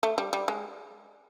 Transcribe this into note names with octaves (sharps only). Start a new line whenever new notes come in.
A3
G3
G3
G#3